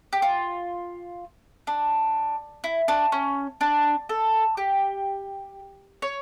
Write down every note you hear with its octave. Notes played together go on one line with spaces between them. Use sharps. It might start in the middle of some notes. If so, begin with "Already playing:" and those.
G4
F4
D4
E4
D4
C#4
D4
A4
G4
C#5